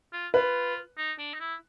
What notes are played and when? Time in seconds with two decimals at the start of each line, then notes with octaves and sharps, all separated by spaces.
0.13 F4
0.34 F4 B4
0.97 D#4
1.19 D4
1.34 D#4
1.40 E4